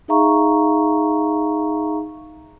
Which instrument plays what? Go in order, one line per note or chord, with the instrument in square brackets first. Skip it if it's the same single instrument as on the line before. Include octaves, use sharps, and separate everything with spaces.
[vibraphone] D#4 G#4 E5 F5 A#5 C#6